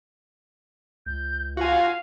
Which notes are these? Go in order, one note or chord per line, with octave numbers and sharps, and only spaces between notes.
C#2 G6
F4 F#4 F5 G#5